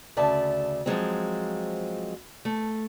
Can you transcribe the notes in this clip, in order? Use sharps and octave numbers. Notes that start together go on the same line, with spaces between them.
D2 C#3 D5 E5 A5
F3 F#3 G#3 C4
A3